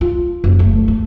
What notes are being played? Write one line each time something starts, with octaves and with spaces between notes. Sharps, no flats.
F4
F#1
A3
A3